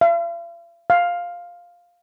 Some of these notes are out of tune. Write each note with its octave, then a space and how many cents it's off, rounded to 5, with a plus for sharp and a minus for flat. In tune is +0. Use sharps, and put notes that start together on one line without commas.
F5 -45
F5 +5